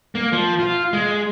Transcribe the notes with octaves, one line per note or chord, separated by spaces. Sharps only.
A#3
F3
F4
G#3